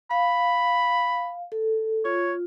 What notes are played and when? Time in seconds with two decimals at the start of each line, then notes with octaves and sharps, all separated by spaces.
0.11 F5 B5
1.52 A4
2.05 F4 C#5